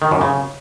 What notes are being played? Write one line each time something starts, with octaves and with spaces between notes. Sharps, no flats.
D#3
F#2
C#3